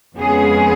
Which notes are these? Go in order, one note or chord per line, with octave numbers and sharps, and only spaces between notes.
F2 C#3 G#3 B3 G#4